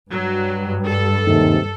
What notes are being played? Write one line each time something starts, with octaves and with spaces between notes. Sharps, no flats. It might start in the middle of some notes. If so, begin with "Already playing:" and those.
G2 F#3
A4
D#2 G#2 C3